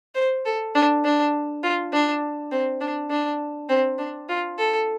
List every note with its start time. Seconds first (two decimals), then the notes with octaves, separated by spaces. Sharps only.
0.15 C5
0.45 A4
0.75 D4
1.04 D4
1.63 F4
1.93 D4
2.52 C4
2.81 D4
3.10 D4
3.69 C4
3.98 D4
4.29 F4
4.58 A4